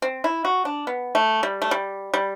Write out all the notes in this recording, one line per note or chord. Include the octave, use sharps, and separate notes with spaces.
C4
E4
F#4
D4
B3
A3
G3
A3
G3
G3